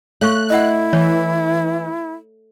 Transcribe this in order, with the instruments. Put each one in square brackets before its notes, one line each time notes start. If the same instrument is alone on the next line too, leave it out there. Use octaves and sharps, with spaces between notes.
[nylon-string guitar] A3 [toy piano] C#5 F5 C#6 [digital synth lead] F#6
[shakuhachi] E4 [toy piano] D#5 E5 F#5
[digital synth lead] E3 [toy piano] C#5